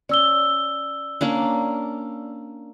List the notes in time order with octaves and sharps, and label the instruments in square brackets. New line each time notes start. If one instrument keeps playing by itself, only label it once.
[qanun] C#4 [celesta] D5 E6 G7
[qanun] A#3 C#4 D4